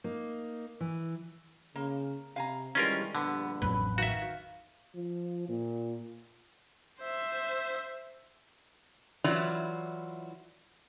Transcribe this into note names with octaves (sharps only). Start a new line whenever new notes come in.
A#3 D#4
E3
C#3 A#3
C3 F5 G#5 A#5
D#3 E3 G3 G#3 C#4 F4 A#4
A#1 G2 D3 B3
A1 F2 F#3 B4
D#3 F#4 E5 F5
F3
A#2
C5 E5
E3 F#3 E4 F4 D5